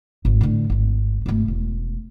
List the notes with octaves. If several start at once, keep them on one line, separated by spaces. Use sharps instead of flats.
G#1 G#2
A2 D3
G#1 C4
G#1 A3
E1